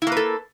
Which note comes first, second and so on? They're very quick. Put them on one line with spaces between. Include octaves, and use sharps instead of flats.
E4 A#3 B4 A4